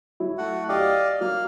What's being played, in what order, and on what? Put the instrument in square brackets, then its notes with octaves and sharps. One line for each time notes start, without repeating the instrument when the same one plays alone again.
[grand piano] F#3 E4
[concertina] A3 F#4 F#5
[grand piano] G4 [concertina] D5 D#5 F5
[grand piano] F#3 [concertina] A#3 F6